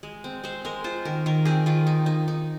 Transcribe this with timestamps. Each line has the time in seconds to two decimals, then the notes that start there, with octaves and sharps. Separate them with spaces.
0.03 G#3
0.24 C4
0.44 G#3 C5
0.65 G#3 A#4
0.84 F4 C5
1.05 D#3 A#4
1.26 D#3 A#4
1.45 C4 G#4
1.66 D#3 F4
1.87 D#4
2.06 D#4
2.28 D#4